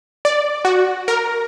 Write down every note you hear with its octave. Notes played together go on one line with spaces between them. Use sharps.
D5
F#4
A#4